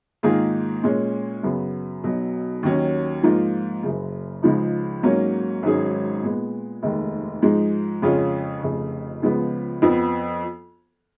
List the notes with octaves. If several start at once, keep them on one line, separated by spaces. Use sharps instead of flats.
G#2 D#3 A#3 F4 G#4
A#2 G#3 C#4
F#2 C#3 F#3 B3
B1 B2 F#3
D#2 D#3 F#3 C#4
G#2 F3 A#3 F4
F#1 F#2 C#3
C#2 C#3 F3 G#3 D#4
G#2 F#3 A#3 C#4
G#1 G#2 F#3 C#4 G#4
A#2 G#3 B3
F1 D#2 D#3 G#3
G#2 F3 G#3
F2 C#3 G#3 C#4 F4
F1 F2 C#3
C#2 C#3 F3 G#3 B3
F2 F3 B3